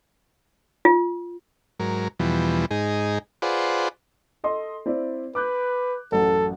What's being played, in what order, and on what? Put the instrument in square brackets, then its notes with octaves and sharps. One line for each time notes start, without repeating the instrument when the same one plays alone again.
[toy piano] F4
[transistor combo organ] G#2 F#3 A#4
E2 B2 E3 F3 G3
G#2 D#4 G#4
F4 G#4 B4 C5 D5 F#5
[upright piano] A4 D#5 C6
C4 E4 D5
[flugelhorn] B4 [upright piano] D6 F#6 G6
[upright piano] A1 F#2 [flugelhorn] A4